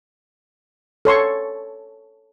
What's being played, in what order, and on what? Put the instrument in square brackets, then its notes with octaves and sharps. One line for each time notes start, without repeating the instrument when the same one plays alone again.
[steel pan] A4 C#5 C6 C#6